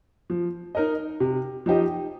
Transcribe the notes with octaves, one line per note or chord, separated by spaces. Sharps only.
F3
D#4 A#4 D#5
C3
F3 D#4 G4 D#5